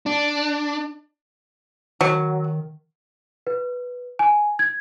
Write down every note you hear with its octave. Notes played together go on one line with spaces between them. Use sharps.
D4
D#3 F#3
B4
G#5
G#6